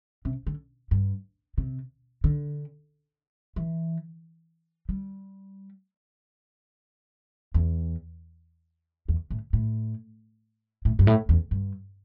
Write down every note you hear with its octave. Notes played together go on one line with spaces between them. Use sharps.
C3
D3
G2
C3
D3
E3
G3
E2
E2
A2
A2
A2
G2
A2
E2
G2